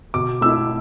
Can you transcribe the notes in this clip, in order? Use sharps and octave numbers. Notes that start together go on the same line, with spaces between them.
B2 D6
A3 E4 E6